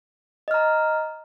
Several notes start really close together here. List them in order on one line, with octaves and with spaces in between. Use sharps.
D#5 F6 A#5